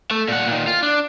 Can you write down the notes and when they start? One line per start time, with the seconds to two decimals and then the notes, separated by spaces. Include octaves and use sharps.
0.11 A3
0.28 A#2 F#5
0.47 A#2 D#3
0.67 F4
0.83 D4